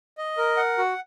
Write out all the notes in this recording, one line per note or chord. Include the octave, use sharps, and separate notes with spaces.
D#5
A#4
F#5
F#4